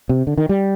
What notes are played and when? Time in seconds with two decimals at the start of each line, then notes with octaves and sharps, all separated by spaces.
0.09 C3
0.27 D3
0.38 D#3
0.49 G3